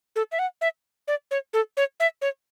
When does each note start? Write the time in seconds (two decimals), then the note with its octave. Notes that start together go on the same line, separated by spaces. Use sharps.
0.16 A4
0.32 E5
0.39 F#5
0.61 E5
1.08 D5
1.31 C#5
1.53 A4
1.77 C#5
2.00 E5
2.22 C#5